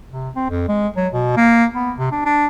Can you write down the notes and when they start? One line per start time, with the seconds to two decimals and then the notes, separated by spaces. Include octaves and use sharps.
0.11 C3
0.36 C4
0.50 F2
0.68 G#3
0.96 F#3
1.13 B2
1.37 A#3
1.75 B3
1.98 C3
2.12 D4
2.25 D4